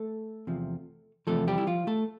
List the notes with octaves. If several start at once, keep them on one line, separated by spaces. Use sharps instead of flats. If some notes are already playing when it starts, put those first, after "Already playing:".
Already playing: A3 A4
E2 C3 F3
E2 C3 F3 A3 A4
G3 G4
E4
F3 F4
A3 A4